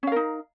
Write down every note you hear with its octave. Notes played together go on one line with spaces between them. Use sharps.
C#4 D#4 A#4 F5